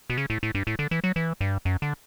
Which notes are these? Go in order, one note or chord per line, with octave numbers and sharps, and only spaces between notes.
B2
C#3
A2
A2
G2
A2
D3
E3
F#3
E3
G2
F#2
D3